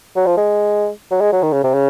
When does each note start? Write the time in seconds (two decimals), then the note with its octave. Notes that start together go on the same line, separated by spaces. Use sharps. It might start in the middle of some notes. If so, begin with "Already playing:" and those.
0.16 F#3
0.26 F3
0.37 G#3
1.11 F#3
1.21 G#3
1.32 F#3
1.43 D#3
1.52 C#3
1.64 C3
1.74 C#3